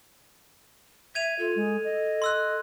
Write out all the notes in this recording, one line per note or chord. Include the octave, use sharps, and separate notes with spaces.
E5 G#6 D#7 F7
F4 A4
G#3
D#5
C6 E6 F#6